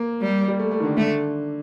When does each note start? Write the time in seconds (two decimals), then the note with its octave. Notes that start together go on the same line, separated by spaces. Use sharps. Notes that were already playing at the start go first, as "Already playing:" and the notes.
Already playing: A#3
0.21 G3
0.48 G3
0.59 A3
0.71 A3
0.80 D#3
0.84 D3
0.97 D3 A3